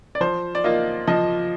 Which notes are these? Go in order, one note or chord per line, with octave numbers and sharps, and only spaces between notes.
D5
F3 C5
D5
A#3 F4 D#5
F3 D#5